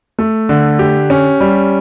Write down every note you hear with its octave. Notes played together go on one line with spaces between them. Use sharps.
A3
D3
G4
C#4
G3